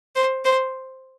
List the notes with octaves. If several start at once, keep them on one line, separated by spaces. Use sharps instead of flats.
C5
C5